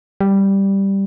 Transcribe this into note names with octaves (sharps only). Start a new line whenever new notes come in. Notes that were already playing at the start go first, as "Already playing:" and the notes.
G3